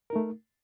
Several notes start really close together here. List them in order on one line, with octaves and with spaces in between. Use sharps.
A#4 D#4 A3